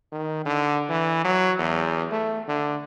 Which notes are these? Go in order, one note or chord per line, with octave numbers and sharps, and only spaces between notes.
D#3
D3
E3
F#3
E2
A3
D3